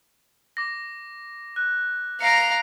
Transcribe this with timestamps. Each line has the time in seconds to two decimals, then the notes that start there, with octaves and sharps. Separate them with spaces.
0.57 D6 A#6
1.56 F#6
2.20 F5 A#5 C#7 D7